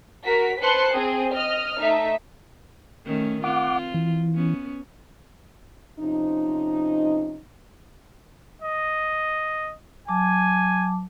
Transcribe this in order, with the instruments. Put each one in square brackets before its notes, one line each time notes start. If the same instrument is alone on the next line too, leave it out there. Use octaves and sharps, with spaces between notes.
[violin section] F#4 A#4 B6
B4 C5 A5 C6 F#6 C#7
C4 G#4
D#5 F6
A3 D#4 E5
[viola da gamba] D#3 A3 C#4
[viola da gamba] C4 F4 [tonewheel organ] F#5 D6
[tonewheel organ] E3
[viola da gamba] B3 C#4
[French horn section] C3 F3 C#4 D#4
[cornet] D#5
[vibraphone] F#3 A5 D6 [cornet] G#5